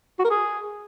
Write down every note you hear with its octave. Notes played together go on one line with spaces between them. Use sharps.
F#4
A#4
G#4